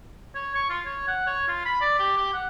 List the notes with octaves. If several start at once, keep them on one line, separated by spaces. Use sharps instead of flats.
C#5
C#6
F4
C#5
F#5
C#5
F4
B5
D5
G4
G4
F#5